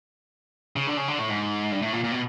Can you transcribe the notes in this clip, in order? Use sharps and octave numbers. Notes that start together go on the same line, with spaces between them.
C#3
D3
C#3
D3
A2
G#2
G2
A2
A#2
A#2
B2